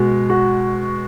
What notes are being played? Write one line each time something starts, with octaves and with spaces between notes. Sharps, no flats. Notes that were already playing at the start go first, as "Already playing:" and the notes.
Already playing: B2 G#3
F#4